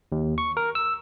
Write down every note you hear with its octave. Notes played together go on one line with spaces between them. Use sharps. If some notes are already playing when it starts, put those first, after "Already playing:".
D#2
C#6
A#4
E6